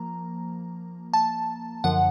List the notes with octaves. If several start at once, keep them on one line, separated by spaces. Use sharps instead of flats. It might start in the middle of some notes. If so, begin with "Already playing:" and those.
Already playing: F3 A#3 A#5
A5
F#2 D3 F3 F#5